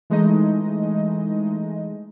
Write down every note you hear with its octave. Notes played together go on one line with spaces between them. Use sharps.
E3 G#3 A3 D#4 D#5